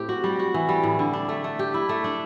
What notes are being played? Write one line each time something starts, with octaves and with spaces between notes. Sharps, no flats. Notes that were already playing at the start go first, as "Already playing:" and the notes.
Already playing: A2 C4 G4
F#4
G3
F#4
E3
G3
A2
D3
D4
A3
A3
G4
E4
A3
D4